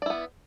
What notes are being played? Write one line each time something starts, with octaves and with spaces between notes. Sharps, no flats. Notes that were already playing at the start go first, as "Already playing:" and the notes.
B3 E4 D5